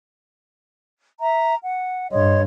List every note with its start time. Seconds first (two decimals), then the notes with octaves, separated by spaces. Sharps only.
1.22 E5 A#5
1.62 F#5
2.12 G2 C#5 D#5 C6